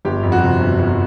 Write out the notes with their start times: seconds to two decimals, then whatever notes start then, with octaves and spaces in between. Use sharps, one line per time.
0.05 G1 G4
0.23 F2
0.32 F#4
0.42 C3
0.60 G1
0.79 G1